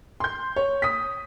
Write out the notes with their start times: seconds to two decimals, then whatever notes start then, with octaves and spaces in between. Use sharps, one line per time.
0.20 C6 G6
0.56 C#5
0.82 D#6 B6